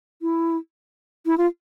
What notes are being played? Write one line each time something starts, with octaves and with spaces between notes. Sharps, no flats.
E4
E4
F4